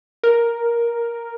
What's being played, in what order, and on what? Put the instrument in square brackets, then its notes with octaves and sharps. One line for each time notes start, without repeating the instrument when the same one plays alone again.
[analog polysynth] A#4